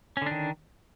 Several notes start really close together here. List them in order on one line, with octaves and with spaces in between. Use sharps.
C#4 D3 D4 D#3